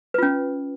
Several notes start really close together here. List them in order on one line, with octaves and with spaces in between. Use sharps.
B4 F4 C#4